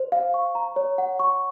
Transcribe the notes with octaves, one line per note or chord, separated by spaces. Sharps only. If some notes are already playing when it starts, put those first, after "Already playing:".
Already playing: C5
F5
C#6
A#5
C#5
F#5
C#6